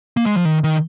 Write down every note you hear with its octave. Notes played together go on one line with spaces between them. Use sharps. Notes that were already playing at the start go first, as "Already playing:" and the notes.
A#3
G#3
F3
D#3
D#3